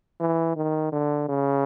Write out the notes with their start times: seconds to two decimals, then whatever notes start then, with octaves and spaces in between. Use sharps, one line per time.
0.20 E3
0.56 D#3
0.92 D3
1.28 C#3